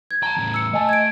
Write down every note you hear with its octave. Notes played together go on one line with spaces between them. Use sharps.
G#6
G5 A5 A#5
E2 A2
E6 C#7
A3 D#5 G#5 A5
G#6 D7